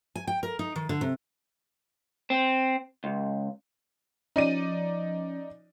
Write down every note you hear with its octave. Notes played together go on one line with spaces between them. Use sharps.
G#5
G5
A#4
D#4
D#3
D3
C3
C4
C#2
F3 C#4 D#4 D5 D#7